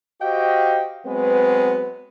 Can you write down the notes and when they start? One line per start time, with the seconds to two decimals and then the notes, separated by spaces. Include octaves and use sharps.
0.22 F#4 G4 C5 D#5 F5 G5
1.06 F#3 G#3 B3 C4 B4